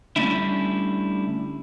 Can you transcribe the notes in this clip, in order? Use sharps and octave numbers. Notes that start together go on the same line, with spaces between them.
D3 G3 A3 C#4 D4 E4